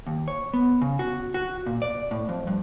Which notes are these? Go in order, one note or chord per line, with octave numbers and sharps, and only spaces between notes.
D#2
C#5
B3
C#3
F#4
F#4
A#2
D5
A2
F2
G2